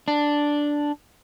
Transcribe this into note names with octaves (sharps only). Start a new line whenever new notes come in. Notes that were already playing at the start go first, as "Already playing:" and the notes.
D4